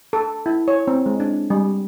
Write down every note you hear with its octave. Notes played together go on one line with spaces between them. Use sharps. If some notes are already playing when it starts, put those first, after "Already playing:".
A4
E4
C#5
C4
G#3
D4
G3